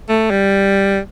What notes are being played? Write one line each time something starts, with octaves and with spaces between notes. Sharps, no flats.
A3
G3